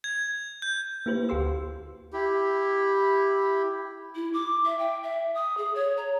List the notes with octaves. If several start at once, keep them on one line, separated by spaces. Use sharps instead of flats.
G#6
G6
A#3 E4 G4 B4 C5
D2 F#4 G4 F5 C6 E6
E4 G4
E4
D6
E5
G5
E5
D#6
G#4
C#5
A#5